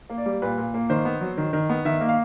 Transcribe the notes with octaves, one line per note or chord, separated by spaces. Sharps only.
A#3
D5
G3
A#2 B4
A#2
A#3
D#3 C5
B3
F#3
D#3
D#3
B3
D#3 E5
A#3
F5